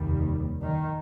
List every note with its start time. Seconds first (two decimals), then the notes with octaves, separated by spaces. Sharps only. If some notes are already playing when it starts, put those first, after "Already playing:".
Already playing: F1 D#2 D#3 G3
0.62 D#3